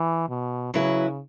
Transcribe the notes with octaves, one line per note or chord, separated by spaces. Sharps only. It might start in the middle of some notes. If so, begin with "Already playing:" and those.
Already playing: E3
B2
C#3 F#3 E4 B4